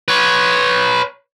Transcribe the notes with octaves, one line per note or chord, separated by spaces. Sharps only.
B4 C#5